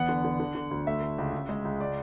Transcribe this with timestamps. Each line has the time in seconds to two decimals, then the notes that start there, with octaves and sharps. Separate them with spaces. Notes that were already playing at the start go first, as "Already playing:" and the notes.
Already playing: E2 B3 F#5
0.09 D3
0.24 D3
0.40 D3
0.55 D3
0.71 D2
0.87 A3 E5
1.02 A3
1.18 C#2
1.33 C#3
1.49 G#3
1.65 C#2
1.81 D5